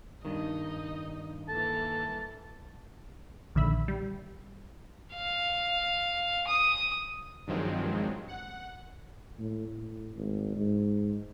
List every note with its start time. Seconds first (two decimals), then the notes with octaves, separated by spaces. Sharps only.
0.25 G2 D#3 D#4 D#5
1.49 E3 A#3 A4 A5
3.55 A#1 D3 D#3 E5 B5
3.88 G3
5.14 F5
6.47 D#6
7.47 G2 D#3 F3 F#3 G#3 C4
8.28 F#5
9.39 A2
9.76 A2
10.16 G#1
10.56 G#2